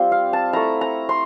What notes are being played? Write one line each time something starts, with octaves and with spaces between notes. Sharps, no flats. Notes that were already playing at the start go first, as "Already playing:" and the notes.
Already playing: G3 C4 F4
F5
A5
A3 E4 A#5
A#5
C6